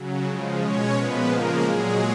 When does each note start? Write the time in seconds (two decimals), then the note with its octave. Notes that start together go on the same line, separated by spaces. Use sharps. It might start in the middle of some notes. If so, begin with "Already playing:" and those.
Already playing: C#3 F#3
0.26 C#3 F3 G#3
0.60 B2 G#3 C#4 C#5
0.94 A#2 F3 G#3 B3 B4
1.28 C#3 F3 G#3 A#3 A#4
1.62 A#2 F#3 G#3 G#4